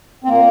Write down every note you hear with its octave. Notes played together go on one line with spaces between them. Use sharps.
C4
A#2 A#3